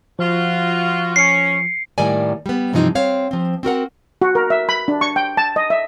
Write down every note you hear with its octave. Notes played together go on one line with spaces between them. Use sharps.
F3 F4 F#4
C#4 C7 C#7
A2 D#3 G3 A#3 D5 G#5
G3 B3
G2 C3 E3 F3 D#4
C4 C#5 F5
F3 C4
C4 F#4 A#4 F#5
F#4
A#4
E5
B5
D4
C#6
G5
A5
D#5
E5